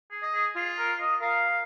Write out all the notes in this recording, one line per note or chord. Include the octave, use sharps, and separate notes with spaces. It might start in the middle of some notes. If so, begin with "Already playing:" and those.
G#4
D#5
G#4
F4 G#4
A#4
D#5
A#4 F5